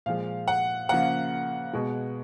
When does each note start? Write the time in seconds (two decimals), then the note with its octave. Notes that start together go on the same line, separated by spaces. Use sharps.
0.06 A#2 F3 G#3 F5
0.48 F#5
0.89 C#3 F3 A#3 F#5
1.73 B2 G#3